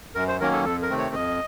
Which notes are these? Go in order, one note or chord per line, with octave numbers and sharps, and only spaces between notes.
F#2 A#4
C5
D#3 F#3 A#3 C#4 A#4
A4
F2 A4
A#4
C3 D#3 A3 C4
C#5
F2 D#5